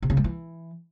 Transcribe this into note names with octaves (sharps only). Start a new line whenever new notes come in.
C3
C#3
G3
E3